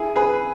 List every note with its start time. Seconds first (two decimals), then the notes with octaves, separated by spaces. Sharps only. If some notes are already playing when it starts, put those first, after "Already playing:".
Already playing: E4 G#4
0.16 G#4 B4